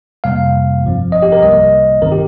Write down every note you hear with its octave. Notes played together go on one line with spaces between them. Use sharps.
F2 C3 G3 A#3 F5
G1 G2 F3 C4
D#5
G4
A#4
C2 C3 G3 A#3 D#5
G1 G2 D#3 C4 A#4
G4